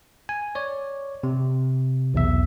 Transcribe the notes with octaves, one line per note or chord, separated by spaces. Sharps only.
G#5
C#5 D5
C3
B1 E2 E5